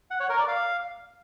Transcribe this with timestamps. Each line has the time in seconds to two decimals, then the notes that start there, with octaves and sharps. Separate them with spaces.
0.11 F#5
0.20 C#5
0.29 A#4
0.39 D5
0.48 F5